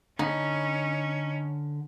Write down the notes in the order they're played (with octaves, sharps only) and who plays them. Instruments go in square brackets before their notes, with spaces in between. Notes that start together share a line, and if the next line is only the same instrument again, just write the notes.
[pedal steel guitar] D3 B5 [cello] C#4 [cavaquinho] D#4